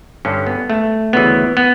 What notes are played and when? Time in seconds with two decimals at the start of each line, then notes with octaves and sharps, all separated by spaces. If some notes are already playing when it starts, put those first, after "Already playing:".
0.25 G2 D3 C#4
0.47 B3
0.70 A3
1.13 D2 C#3 E3 B3
1.57 B3